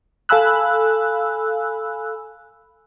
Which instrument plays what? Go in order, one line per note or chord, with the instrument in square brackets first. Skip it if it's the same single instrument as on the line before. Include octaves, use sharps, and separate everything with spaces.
[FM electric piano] A4 F5 G#5 B5 E6 F#6